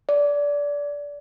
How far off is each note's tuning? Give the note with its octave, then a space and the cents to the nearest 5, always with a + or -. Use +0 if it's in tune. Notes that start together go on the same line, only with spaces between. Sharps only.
D5 -20